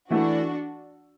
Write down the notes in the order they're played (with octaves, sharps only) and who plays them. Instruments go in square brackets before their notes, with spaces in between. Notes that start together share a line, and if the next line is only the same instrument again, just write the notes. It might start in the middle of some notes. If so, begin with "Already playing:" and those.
[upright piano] E3 A3 E4 A4 [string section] D4 F#4